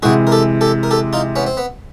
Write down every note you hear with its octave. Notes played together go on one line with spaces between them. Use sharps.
C3 E3 G#3 F#4 G#4
A#4
G4 A4
G4 A4
A#4
G4 A4
D#4 F4
B3 C#4
C4
B3